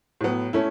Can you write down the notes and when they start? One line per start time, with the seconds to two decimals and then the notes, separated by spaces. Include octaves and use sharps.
0.21 A2 F#3 B3
0.53 A3 C#4 E4